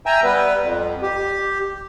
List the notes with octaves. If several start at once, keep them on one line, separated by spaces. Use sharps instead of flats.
E5 G5 G#5 A#5 E6
G3 B3 B4
F2
G4